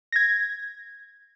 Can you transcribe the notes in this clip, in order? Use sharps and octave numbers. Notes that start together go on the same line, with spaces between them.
G#6 A#6